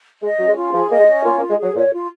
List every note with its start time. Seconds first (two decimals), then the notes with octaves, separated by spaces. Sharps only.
0.22 G#3 D#5
0.39 F#3 C#4
0.48 G#3
0.56 F4
0.73 F3 G#4
0.90 A#3 D#5
0.99 G#3
1.07 C#4
1.25 A#3 F4
1.37 A#3
1.42 F4
1.50 G#3
1.58 F#3 G#4
1.75 A#2 C#5
1.93 F4